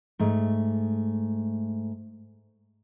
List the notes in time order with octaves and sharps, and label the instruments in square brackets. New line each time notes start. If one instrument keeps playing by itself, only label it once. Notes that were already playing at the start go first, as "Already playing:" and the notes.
[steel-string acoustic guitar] G#2 A3